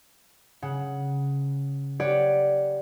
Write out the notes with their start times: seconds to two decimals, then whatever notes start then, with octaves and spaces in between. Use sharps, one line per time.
0.62 C#3 F#5
2.00 G4 B4 C#5 D5 F#5